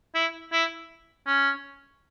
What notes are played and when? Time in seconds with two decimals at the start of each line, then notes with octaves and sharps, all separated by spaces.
0.15 E4
0.52 E4
1.27 C#4